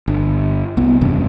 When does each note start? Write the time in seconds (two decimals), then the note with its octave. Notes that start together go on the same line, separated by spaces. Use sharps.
0.08 G1
0.77 C2 B3
1.01 F#1 E2 G2 C3